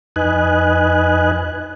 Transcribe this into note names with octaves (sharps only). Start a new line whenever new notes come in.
F2 D#4 B4 D#5 G#5 F#6